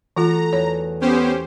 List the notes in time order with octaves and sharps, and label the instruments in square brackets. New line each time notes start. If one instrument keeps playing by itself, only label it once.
[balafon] E3 F4 [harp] A3 F#4 A4 [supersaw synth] A#5
[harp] E2 [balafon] C#5
[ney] B3 [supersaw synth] C#4 G4 C5